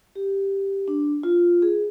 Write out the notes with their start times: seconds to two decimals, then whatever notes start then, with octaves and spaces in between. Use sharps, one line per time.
0.15 G4
0.88 D4
1.23 F4
1.62 G#4